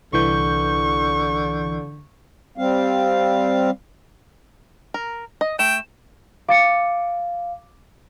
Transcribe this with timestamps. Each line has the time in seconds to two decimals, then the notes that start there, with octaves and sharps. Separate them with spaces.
0.13 C2 D3 E3 C#6 G6
2.58 G3 C4 F5
4.94 A#4
5.41 D#5
5.59 A3 G5 E7
6.49 F5 D6 A6 C#7